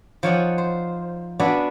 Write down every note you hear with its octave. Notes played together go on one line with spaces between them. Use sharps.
F3 D#4 C#5 D5 F#5 G#5
C5
B3 D4 F#4 D5 E5 G#5